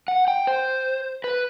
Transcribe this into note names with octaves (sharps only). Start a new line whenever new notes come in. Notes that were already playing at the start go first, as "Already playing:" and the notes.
F#5
G5
C5
B4